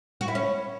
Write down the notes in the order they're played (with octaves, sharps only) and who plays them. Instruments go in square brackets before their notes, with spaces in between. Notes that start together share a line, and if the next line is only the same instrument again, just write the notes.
[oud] F#4
E4
C#4